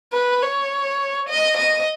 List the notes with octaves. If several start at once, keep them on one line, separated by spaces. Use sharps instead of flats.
B4
C#5
D#5
D#5